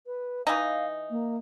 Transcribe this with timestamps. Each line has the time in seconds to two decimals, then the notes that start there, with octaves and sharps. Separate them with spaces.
0.06 B4
0.47 E3 D#4 F5
1.10 A#3